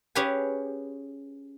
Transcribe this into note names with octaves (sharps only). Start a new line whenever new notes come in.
C#4 G4 G#4 B4 F5 G#5